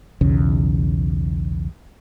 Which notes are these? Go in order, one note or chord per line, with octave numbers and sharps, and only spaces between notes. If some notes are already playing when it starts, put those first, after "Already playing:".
B1 E2 C#3